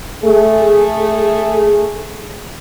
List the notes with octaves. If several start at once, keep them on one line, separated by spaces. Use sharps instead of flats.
A3 G#4